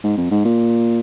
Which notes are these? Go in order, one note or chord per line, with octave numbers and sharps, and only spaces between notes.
G#2
F2
G#2
A#2